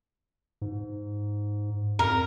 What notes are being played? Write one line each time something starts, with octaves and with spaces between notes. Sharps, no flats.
G#2
F2 A#4